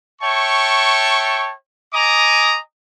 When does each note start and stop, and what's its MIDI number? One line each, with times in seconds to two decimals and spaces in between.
0.22 1.52 73
0.22 1.52 76
0.22 1.52 79
0.22 1.52 81
0.22 1.52 85
1.93 2.59 75
1.93 2.59 80
1.93 2.59 82
1.93 2.59 86
1.93 2.59 87